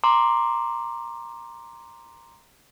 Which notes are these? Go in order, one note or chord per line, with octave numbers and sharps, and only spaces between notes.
A#5 C6 D6